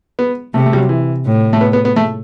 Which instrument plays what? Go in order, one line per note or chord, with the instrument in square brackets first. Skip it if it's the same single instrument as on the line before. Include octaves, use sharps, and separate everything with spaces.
[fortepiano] B3
[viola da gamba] C3 [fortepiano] A3
[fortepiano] A3
G3
F#3
E3
[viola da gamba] A2
[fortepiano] A3
B3
B3
B3
A3